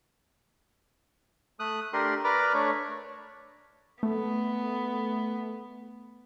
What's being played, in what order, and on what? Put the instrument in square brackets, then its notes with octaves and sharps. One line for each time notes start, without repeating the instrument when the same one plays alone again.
[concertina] A3 D#6 F#6
A3 D4 G4 A#4 C6
A#4 B4 D5 B5 D6 F6
A3 D4 C#5
[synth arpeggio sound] A3 [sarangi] B3